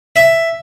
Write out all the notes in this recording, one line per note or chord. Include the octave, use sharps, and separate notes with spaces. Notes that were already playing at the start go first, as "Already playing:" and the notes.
E5